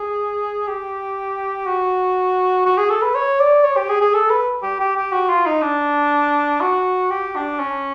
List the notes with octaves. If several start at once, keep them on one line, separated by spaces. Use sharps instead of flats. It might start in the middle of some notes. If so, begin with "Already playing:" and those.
Already playing: G#4
G4
F#4
F#4
G#4
A4
B4
C#5
D5
C#5
G4
G#4
G#4
A4
B4
G4
G4
G4
F#4
F4
D#4
D4
F#4
G4
D4
C#4